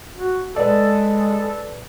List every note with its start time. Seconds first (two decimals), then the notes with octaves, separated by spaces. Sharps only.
0.16 F#4
0.56 G#3 A4 B4 D5